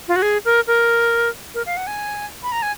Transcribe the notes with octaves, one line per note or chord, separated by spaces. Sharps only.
F4
F#4
G#4
A#4
A#4
A#4
F5
F#5
G#5
B5
A#5
G#5